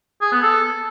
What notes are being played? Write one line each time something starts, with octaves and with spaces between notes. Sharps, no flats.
G#4
B3
A4